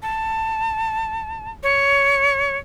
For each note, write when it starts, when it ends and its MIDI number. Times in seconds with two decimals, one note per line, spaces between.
0.02 1.51 81
1.63 2.57 73